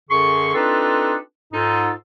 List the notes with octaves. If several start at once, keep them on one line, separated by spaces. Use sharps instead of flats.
F#2 D3 G#4 C6 C#6
C4 D4 D#4 F4 A4 B4
G#2 D#4 F4 A4